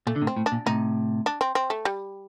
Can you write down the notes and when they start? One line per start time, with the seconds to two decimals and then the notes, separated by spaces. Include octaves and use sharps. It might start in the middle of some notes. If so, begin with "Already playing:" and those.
0.07 A#2 A3
0.16 D3
0.21 A2 C3
0.27 C4
0.36 A2
0.46 D4
0.52 A#2
0.66 A2 C3 D#4
1.26 D4
1.41 C4
1.55 C4
1.70 A3
1.85 G3